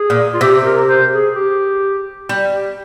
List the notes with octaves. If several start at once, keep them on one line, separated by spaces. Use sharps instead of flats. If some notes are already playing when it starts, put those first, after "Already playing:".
Already playing: G#4
A#2
F4
C3 G4
A#4
C5
G#4
G4
G3
G4